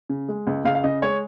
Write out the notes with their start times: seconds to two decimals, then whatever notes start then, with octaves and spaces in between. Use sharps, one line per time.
0.09 C#3
0.28 G#3
0.47 C#2
0.65 C#2 F5
0.75 F5
0.84 C#3 D#5
1.02 G#3 C#5